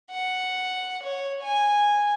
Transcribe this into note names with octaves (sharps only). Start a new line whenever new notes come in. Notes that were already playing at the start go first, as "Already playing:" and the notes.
F#5
C#5
G#5